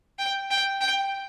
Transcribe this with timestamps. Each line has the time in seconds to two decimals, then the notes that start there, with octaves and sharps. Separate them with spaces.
0.19 G5
0.51 G5
0.81 G5